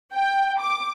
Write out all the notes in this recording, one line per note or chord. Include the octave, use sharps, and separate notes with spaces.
G5
D6